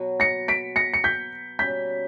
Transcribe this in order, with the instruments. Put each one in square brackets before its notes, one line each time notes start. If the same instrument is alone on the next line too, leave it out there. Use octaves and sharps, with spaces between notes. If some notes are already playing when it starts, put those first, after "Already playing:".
Already playing: [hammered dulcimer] B2 F#3 B3
[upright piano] A#6 C#7
B6 D7
A#6 C#7
C#7
G6 B6
[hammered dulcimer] B2 G3 A#3 C#4 [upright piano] G6 B6